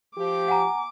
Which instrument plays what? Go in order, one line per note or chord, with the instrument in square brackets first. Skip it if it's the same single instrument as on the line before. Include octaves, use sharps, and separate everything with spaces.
[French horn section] F3 G4 [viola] D6
[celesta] F#5 G#5 A#5